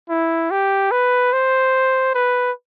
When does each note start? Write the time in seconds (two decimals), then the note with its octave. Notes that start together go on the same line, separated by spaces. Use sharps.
0.09 E4
0.51 G4
0.92 B4
1.33 C5
2.15 B4